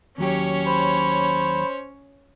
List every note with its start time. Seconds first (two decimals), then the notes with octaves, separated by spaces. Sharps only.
0.18 D#2 F#3 C#4 G4 C#5
0.67 C5 B5